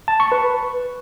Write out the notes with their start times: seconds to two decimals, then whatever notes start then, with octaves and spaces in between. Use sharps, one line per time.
0.08 A5
0.20 C#6
0.32 B4